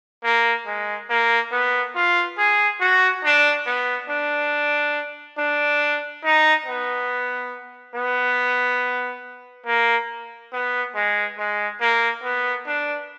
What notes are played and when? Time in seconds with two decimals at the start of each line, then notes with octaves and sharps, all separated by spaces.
0.24 A#3
0.66 G#3
1.10 A#3
1.52 B3
1.95 F4
2.38 G#4
2.81 F#4
3.25 D4
3.67 B3
4.10 D4
5.38 D4
6.24 D#4
6.66 B3
7.95 B3
9.66 A#3
10.53 B3
10.95 G#3
11.38 G#3
11.81 A#3
12.24 B3
12.67 D4